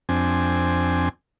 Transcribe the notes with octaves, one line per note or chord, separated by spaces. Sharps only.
F2 C4 D4 G#5